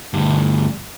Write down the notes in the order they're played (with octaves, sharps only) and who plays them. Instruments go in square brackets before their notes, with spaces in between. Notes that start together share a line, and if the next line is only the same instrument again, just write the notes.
[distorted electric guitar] D2 G2